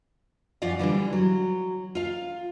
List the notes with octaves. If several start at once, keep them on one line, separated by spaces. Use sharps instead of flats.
F2 C#4 F4 D5 F5 F#5
D3 E3 G3 D4
F#3
F4 F5